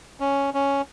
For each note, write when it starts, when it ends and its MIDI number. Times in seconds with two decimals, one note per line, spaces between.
0.20 0.50 61
0.54 0.82 61